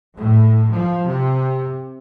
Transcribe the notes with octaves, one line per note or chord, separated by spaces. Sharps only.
A2
F3
C3